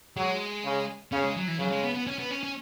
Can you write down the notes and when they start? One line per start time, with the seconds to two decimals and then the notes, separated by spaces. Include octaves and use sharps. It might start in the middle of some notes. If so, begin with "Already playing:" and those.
0.17 F#3 G#3
0.65 C#3
1.12 C#3 C#4
1.24 G#3
1.37 F#3
1.48 E3
1.59 C#3 F#3
1.72 G#3
1.84 B3
1.95 B3
2.07 C#4
2.19 B3
2.31 C#4
2.43 C#4